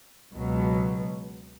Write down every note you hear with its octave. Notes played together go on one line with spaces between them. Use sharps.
C#2 B2 F#3